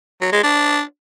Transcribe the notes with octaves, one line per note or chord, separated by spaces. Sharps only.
F#3
G#3
D4